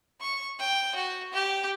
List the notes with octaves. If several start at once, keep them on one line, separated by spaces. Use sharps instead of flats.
C#6
G5
F#4
G4